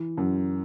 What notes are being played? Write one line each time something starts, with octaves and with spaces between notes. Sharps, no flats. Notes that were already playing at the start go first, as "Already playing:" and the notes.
Already playing: E3
F#2